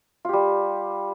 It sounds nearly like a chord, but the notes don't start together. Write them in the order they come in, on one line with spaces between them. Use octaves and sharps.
F4 G4 G3